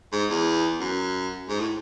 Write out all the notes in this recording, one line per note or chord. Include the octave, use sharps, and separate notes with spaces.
G#2
E2
F#2
G#2
A2